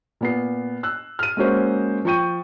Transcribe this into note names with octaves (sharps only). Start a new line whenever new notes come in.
A#2 B3 C7
E6 F#6
F6 D#7
G#3 A#3 C#4 F#4 C5
F3 G5 C#6 G6 D#7